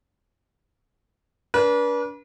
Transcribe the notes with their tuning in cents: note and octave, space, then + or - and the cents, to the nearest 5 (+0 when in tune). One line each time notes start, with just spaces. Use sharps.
D4 -30 B4 -40